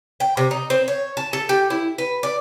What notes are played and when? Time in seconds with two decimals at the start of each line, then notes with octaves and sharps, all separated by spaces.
0.20 G5
0.37 C3
0.51 D#4
0.70 C4
0.88 C#5
1.17 A5
1.33 A4
1.49 G4
1.70 E4
1.98 B4
2.23 D5